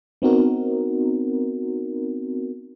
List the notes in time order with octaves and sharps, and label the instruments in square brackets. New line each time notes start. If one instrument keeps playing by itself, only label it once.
[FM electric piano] B3 C4 D#4 F#4 A#4